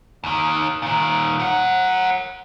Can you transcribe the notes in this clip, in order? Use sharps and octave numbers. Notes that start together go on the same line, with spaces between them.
D#2 D#3
A#2 D#3
A#4 F#5